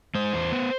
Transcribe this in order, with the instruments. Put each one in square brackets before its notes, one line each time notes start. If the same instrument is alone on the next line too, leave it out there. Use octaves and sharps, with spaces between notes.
[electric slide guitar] G#3 C5
E2
B3